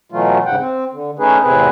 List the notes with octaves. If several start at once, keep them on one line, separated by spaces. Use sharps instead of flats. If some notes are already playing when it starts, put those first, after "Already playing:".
B2 E3 F#3 A3 F4
E2 G#2 C#3 F#5 G5
C4
D3
A3 C#4 D#4 G#4 B4
E2 A2 C3 C4 G#4 B4